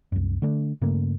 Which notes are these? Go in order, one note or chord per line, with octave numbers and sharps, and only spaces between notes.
C2 F#2
D3 A3 D4
G2 C#3 A3 A#3